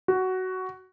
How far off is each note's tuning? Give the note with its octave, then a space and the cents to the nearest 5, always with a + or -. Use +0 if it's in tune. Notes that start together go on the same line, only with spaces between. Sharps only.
F#4 +10